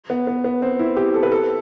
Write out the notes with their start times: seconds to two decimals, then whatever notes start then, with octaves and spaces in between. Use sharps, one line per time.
0.10 B3
0.27 B3
0.44 B3
0.62 C4
0.79 E4
0.97 G4
1.14 A4
1.23 B4
1.32 A4